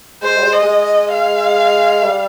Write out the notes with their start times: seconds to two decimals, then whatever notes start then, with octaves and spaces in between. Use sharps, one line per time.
0.22 G#3 C5
0.37 G3
0.43 G#3
0.53 D#5
0.63 G#3
0.83 D#5
1.13 F5
2.04 G3